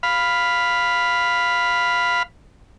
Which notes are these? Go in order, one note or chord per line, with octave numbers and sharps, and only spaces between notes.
F5 B5